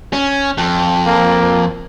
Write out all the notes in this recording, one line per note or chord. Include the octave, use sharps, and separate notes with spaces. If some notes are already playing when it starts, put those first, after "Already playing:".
C#4
F2
A#3